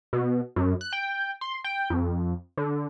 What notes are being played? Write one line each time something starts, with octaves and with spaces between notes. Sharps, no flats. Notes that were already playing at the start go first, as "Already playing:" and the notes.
B2
F#2
F#6
G5
C6
G5
F2
D3